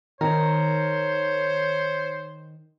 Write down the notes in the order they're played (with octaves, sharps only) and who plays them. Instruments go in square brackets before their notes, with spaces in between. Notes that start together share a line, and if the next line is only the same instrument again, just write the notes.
[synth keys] D#3 [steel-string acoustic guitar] A#4 [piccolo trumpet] C5 [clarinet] C#5